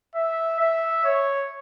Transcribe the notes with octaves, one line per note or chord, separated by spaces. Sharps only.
E5
E5
C#5